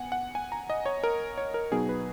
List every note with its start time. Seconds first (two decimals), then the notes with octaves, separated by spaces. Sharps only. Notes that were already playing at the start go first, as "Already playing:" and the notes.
Already playing: B3 F#5 G#5
0.12 F#5
0.35 G#5
0.52 A#5
0.70 D#5
0.86 C#5
1.03 A#4
1.38 C#5
1.54 A#4
1.71 B2 F#3 B3 D#4 G#4
1.89 B4